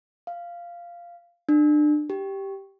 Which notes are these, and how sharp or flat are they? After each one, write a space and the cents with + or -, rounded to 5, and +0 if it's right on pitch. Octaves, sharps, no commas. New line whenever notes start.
F5 -10
D4 +30
G4 -5